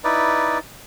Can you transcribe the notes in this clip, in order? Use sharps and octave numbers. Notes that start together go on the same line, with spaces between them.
D#4 E4 B4 D5